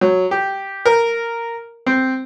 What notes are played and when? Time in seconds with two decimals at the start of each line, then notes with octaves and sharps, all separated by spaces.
0.01 F#3
0.31 G4
0.86 A#4
1.87 C4